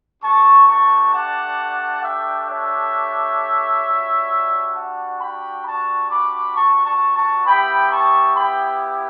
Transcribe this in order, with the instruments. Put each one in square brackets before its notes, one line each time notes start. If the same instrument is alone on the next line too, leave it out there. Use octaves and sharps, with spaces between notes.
[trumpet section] A3 D4 G4 A5 C#6
A5 C#6
F#5 A5
E5 G5
C#5 E5
G3 D4 F#4
F#5 A5
G5 B5
A5 C#6
B5 D6
A5 C#6
A5 C#6
A5 C#6
B3 E4 G4 G5 B5
A5 C#6
G5 B5